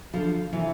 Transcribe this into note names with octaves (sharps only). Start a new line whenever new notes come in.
D3 F3
C3 E3